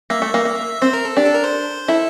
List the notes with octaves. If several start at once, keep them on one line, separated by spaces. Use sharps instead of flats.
A#3 E5
A3
A#3
A#3
C4 C5
A#4
A4
D4 G4
A4
A#4
C5
E4 A4